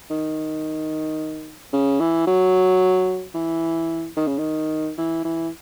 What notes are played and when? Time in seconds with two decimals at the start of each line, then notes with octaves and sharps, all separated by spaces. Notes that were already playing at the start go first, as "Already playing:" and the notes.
0.10 D#3
1.73 C#3
2.00 E3
2.27 F#3
3.35 E3
4.17 D#3
4.28 C#3
4.39 D#3
4.98 E3
5.25 E3